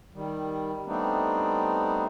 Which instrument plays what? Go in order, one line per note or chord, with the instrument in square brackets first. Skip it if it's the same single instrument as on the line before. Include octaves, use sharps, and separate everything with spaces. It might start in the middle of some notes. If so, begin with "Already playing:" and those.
[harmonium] D#3 G3
G3 A3 B3 C4 D4 D#4